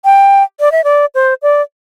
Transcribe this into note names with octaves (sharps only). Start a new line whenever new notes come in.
G5
D5
E5
D5
C5
D5